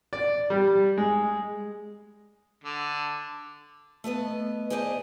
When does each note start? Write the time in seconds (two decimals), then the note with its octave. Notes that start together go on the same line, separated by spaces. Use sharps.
0.13 D5
0.50 G3
0.98 G#3
2.64 D3
4.04 A3 B3 B4 D#5
4.70 G#4 B4 C5 D5 D#5